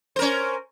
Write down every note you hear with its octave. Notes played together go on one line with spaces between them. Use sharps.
C#4 A#4 C5